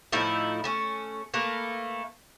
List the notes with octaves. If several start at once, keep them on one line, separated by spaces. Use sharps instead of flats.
A2 F3 D#4 E4
A3 C#4
A3 A#3 B4